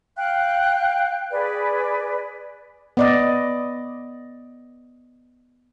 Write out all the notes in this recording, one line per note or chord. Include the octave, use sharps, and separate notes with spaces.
F5 G5 F#6
G#4 B4 D5
B3 D5 D#5